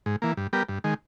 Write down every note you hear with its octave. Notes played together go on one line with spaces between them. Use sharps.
G#2
E3 A#3
G2
G3 B3 G4 A#4
G2
D#3 G#3